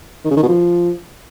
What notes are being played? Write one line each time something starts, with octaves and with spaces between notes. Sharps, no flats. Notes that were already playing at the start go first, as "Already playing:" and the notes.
D#3
C#3
D#3
B2
F3